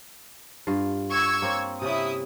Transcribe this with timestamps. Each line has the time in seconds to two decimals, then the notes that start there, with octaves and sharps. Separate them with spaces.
0.67 G2 F4
1.10 C#6 E6 G#6
1.42 A#3 C4 C#5
1.82 C3 C#4 E4 D#6